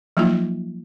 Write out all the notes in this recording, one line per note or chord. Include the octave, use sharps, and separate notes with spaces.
F3 F#3 A#3 D#4 F4